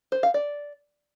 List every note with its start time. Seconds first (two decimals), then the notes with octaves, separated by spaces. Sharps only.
0.12 C5
0.23 F5
0.34 D5